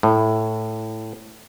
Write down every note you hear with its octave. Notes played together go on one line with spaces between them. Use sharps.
A2